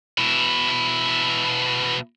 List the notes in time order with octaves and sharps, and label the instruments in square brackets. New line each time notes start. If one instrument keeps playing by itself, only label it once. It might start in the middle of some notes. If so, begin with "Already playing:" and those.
[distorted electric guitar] B2 E4